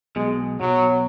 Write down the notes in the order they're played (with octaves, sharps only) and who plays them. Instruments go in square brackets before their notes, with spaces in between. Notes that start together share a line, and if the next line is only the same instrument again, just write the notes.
[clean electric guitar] B1 B2 [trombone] G#3
[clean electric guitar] B1 B2 [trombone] F#3